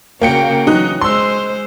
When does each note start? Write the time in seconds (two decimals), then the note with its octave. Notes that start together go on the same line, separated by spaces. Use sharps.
0.21 C#3 A#3 F#4 G5 C#7
0.67 E3 F#3 D#4 F#6
1.01 G#3 C5 C6 E6